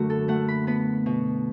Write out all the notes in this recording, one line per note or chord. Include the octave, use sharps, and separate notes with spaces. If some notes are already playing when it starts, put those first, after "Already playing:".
Already playing: F#2 D3 A3 F#4
A4
A3 F#5
B5
B3 B5
B2